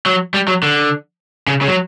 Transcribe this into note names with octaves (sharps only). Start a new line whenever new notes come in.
F#3
G3
F#3
D3
C#3
C#3
F#3